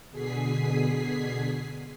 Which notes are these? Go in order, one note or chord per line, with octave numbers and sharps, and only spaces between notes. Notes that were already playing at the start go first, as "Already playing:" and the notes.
B2 D3 G#4 G#5 B6 C7